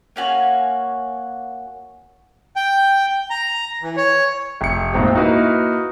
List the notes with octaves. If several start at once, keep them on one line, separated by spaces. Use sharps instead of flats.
A#3 C#4 F#4 G#5
G5
A#5
E3
C#5
F1 C#7
D#1 G#2 C4 G4
A#3 D#4 E4 F#4 A#4 B4